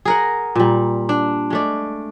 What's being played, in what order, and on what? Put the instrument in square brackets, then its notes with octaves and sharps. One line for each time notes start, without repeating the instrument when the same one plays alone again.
[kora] G#4 A#4 F#5
A#2 G3
D4
G#3 A3 D5